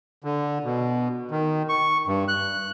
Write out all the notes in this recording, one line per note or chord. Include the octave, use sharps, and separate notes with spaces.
D3
B2
D#3
C#6
G2
F#6